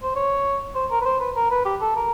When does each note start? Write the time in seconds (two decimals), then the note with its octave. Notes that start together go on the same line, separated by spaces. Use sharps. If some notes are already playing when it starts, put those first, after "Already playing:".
0.03 C5
0.16 C#5
0.75 C5
0.91 A#4
1.01 B4
1.05 C5
1.20 B4
1.36 A#4
1.51 B4
1.65 G4
1.81 A4
1.96 A#4